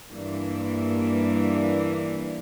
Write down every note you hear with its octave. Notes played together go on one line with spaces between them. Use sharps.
G2 E3 A#3 D4